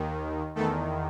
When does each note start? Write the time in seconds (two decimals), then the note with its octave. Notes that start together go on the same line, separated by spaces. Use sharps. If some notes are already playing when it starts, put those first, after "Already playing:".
Already playing: D#2 D#3
0.55 E2 D#3 A3 A4